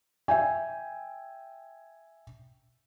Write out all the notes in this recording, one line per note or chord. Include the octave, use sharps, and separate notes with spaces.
E5 G5 G#5